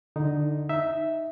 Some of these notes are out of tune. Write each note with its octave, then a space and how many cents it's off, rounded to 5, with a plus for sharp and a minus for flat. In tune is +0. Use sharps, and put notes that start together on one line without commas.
D3 +15 D#4 +0
D#4 +0 E5 +0